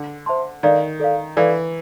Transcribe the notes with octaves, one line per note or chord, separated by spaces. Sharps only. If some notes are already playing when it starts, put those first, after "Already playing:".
Already playing: D3
C5 E5 A5 C6
D#3 A4 D5 F5
A4 D5 F5
E3 A4 D5 F5